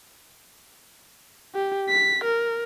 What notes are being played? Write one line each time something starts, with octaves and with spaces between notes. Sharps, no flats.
G4
B6
A#4